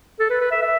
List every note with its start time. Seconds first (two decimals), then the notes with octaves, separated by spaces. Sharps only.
0.19 A4
0.30 B4
0.41 B4
0.51 E5
0.62 E5